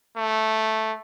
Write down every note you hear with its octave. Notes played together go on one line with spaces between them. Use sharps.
A3